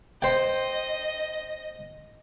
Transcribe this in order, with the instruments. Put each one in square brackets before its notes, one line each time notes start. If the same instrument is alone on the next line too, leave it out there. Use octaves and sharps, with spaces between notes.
[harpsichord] C5 G5 [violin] D#5